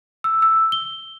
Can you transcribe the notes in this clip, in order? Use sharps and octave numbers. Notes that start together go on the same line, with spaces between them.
E6
E6
G7